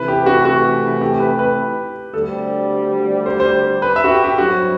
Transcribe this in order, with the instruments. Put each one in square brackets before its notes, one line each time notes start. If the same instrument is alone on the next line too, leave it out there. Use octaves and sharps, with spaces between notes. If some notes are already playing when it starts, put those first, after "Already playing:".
Already playing: [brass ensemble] C3 E3 A3 E4 [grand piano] B4
[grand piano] G4
F#4
F#4
G4
B4
B4
[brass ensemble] D2 D3 G3 C4 [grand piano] A4
[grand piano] C5
C5
B4
E5
F#4
G4
G4
[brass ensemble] G2 F#3 C4 E4 [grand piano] F#4